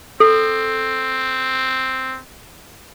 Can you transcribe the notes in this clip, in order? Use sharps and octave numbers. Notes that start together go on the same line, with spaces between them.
C4 A4